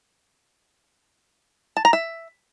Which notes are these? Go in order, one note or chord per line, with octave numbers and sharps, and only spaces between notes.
A5
A#5
E5